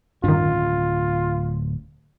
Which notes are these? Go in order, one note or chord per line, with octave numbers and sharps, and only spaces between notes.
D1 G2 D#3 C#4 F4